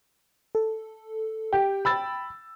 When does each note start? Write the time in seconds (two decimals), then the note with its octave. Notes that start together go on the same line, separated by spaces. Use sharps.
0.55 A4
1.53 G4 G5
1.85 B5 E6 A6